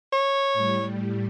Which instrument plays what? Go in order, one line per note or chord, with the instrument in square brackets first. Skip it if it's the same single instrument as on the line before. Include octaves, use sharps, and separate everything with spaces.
[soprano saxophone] C#5
[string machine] A2 G3